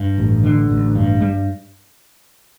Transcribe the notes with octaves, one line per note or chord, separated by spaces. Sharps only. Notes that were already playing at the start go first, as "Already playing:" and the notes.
Already playing: G2
A1
D3
A1
G2
G3